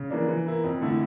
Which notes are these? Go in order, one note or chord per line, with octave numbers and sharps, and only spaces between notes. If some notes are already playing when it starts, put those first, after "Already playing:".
Already playing: C#3
E3 A#3 D4
E3
A#3 E4
F2
D3 A3 E4